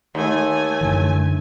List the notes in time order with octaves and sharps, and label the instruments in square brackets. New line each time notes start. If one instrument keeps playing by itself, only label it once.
[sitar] D#2 [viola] A3 G#5
[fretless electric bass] F#2 D3 E3